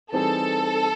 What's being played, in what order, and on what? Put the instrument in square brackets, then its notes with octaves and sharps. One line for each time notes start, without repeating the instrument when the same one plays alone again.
[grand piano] E3 G3 C4 D#4 G#4 [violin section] A4